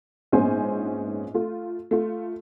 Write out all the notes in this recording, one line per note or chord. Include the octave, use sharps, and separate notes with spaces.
A#1 G#2 B3 C#4 C5 G#5
A3 F4
A3 F4